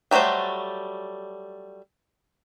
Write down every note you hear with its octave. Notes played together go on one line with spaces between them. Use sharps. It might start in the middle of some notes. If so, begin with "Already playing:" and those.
F#3 G3 A3 F#4 C5